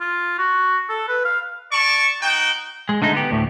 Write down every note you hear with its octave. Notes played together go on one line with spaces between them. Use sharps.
F4
F#4
A4
B4
F5
D5 A5 C#6
D#4 F#4 G5
G#3
D3 G#3 A3 D#4
B3 G4
D2 A2